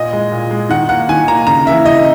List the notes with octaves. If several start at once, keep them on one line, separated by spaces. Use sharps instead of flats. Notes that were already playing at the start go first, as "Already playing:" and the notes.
Already playing: A#2 D#5
G#3
A#2
G#3
D#3 F#5
A#3 F#5
D#3 G#5
A#3 A#5
C#3 A#5
E3 A#3 E5
C#3 D#5